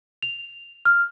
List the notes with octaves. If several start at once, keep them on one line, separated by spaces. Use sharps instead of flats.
F7
F6